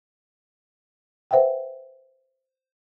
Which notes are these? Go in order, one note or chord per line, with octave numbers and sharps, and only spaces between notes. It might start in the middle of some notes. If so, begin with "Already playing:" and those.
B4 C5 E5 F#5 G5